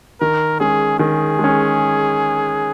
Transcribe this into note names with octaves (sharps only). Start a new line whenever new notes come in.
D#3 A#4
G#3 C#4 G#4
D#3 G#4
G#3
C#4